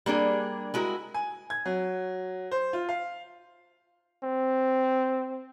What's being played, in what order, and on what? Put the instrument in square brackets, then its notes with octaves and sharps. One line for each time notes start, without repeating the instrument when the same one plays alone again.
[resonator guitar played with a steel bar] G3 A#3 D4 G#4
G#3 E4 F#4 A#4
[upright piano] G#5
G#6
F#3
C5
F4
F5
[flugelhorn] C4